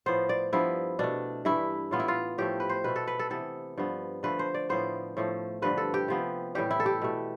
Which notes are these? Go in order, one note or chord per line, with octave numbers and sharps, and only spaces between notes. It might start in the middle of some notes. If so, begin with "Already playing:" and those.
A2 F3 B3 C5
D5
G2 F3 B3 E4
B2 A3 D4
G2 E3 A3 E4
A2 E3 B3 F4
E4
F4
A2 F3 A3 G4
B4
C5
B2 A3 B4
A4
B4
A4
C3 E3 B3 A4
G2 F3 B3
D3 F3 A3 B4
C5
D5
A2 F3 B3 C5
A2 F3 A3
G2 D3 F3 B4
A4
G4
C3 F3 B3
A2 E3 G3 G4
E4
A4
G4
B2 A3